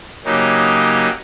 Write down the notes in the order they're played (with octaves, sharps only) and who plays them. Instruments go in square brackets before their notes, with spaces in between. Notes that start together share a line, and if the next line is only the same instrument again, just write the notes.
[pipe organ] C#3 F#3 A#3 D#4 G4